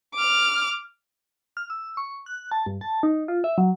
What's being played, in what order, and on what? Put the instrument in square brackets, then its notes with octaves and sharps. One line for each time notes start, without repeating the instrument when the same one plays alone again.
[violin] D6 F6
[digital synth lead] F6
E6
C#6
F#6
A5
G2
A5
D#4
F4
E5
F#3